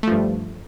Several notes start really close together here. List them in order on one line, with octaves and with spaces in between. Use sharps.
A3 F3 G2